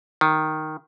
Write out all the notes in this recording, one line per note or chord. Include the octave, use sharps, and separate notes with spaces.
D#3